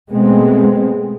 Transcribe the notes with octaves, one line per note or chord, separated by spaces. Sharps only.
B2 G#3 A3 B3 C4